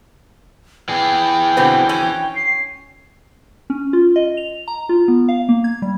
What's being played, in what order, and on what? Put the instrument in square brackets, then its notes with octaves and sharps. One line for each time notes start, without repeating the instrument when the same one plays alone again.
[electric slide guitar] E3 G#4 [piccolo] G5
[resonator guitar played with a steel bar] B2 D3 C4
C#4
[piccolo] C7
[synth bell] C#4
F4
D#5
F7
A#5
F4
B3
F5
A#3
G#6
G3